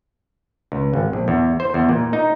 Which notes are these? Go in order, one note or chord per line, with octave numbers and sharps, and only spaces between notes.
C#2
G#1
A#1
E2
C5
E2
A#2
D#4